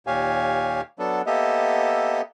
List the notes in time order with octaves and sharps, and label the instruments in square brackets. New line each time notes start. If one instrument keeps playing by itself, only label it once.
[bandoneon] D#2 A#2 G4 C#5 F5 G#5
F#3 B3 D4 A4
A#3 B3 G4 A4 D#5 E5